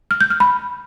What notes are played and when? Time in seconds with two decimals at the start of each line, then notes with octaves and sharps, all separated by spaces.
0.11 F6
0.21 G6
0.30 F6
0.40 B5